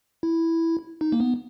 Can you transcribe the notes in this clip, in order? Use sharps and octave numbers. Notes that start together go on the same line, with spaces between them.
E4
D#4
A#3
B3